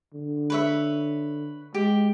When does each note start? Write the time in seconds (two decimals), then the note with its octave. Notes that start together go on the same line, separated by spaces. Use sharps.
0.14 D3
0.50 B4 C#5 E5
1.75 G#3 G4